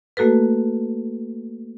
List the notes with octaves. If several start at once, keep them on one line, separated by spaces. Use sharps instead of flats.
A3 A#3 F#4 A4 B4